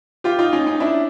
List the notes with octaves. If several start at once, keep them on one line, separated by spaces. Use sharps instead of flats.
F4 G4
D#4 F4
C#4 D#4
C#4 D#4
D4 E4